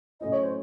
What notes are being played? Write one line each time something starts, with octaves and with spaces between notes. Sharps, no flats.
A2 F#3 A3 C#4 E4 D#5
C#5
C5